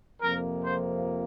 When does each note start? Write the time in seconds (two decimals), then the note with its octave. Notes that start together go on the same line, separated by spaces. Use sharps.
0.21 F2 C3 F3 A#3 A#4
0.63 C5